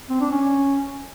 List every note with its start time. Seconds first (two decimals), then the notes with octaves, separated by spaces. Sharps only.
0.10 C4
0.21 D4
0.32 C#4